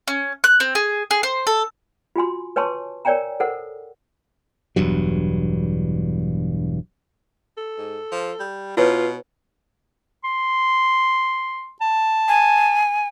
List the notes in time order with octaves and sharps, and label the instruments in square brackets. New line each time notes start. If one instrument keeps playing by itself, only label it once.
[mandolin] C#4
F#6
C4
G#4
G#4
C5
A4
[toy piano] F4 F#4 G#5 C6
B4 C#5 G#5 A5 C6 C#6
A#4 C#5 D5 G5 G#5 A#5
A4 A#4 C5 F#5
[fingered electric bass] E1 E2 G2 F#3
[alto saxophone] A4
[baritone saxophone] G#2
F3
G3
[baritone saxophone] B2 [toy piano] E4 B4 C#5 [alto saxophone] F4
[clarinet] C6
A5
[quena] G#5